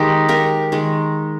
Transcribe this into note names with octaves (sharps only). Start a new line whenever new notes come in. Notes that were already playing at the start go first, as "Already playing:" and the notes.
Already playing: D#3 G#3 D#4 G4
G4 A#4
D#3 G#3